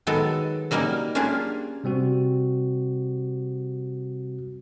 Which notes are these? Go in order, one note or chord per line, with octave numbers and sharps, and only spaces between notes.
D#3 F#3 G#3 B3 A4
F#3 G3 A#3 C#4 D#4
A#3 C#4 D4 F4 G4 G#4
C3 G3 C4 F#4